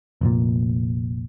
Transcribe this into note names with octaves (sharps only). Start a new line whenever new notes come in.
F1 A#1 A#2